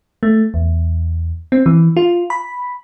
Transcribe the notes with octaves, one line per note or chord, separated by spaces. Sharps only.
A3
E2
C4
E3
F4
B5